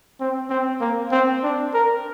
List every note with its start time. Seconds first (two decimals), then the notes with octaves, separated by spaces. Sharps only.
0.20 C4
0.50 C4
0.81 A#3
1.12 C4
1.43 D4
1.74 A#4